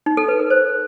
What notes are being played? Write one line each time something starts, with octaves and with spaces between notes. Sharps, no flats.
D#4
A4
B4
A#4
C5